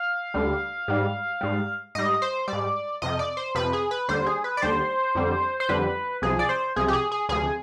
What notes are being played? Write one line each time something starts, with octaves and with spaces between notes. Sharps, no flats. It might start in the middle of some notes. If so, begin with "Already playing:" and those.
Already playing: F5
D2 D3 G3
G#2 G3
G#2 G3
G#2 G3 D#5
C5
G3 D5
G#2
F2 C3 F3 D#5
D5
C5
F2 C3 F3 B4
G#4
B4
D#2 D3 G3 C5
G#4
B4
D5
D#2 D3 G3 C5
F2 D3 G3
C5
F2 D3 G3 B4
C2 C3 F3 G#4
D5
C5
C2 C3 F3 G#4
G4
G#4
G#4
D2 C3 F3 G#4